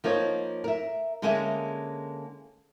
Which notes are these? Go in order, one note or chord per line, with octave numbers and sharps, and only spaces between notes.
F3 A#3 D#4 C#5
A#4 E5
D3 G#3 A#3 C#4 G#4 E5